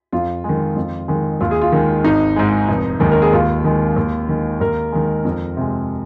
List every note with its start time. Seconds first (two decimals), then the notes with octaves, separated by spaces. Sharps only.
0.12 F2 F4
0.44 D#3 G#3
0.76 F2
1.08 D#3 G#3
1.40 D#2 F4
1.51 G#4
1.61 F4
1.72 D#3 G#3
2.04 G#1 D#4
2.36 G#2 G#3
2.68 F1
3.00 D#2 D#3 G#3
3.11 A#4
3.22 G#4
3.33 D#2 F4
3.65 D#3 G#3
3.96 D#2
4.29 D#3 G#3
4.60 D#2 A#4
4.92 D#3 G#3
5.25 F2
5.57 C3 G#3